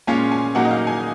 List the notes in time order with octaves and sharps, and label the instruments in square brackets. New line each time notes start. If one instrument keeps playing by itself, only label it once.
[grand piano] A#2 G#3 C#4 F4 [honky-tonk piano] G#5
[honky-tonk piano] G#5
[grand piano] A#2 F#3 A#3 D#4 [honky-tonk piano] F#5
[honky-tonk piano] D#5
F5
G#5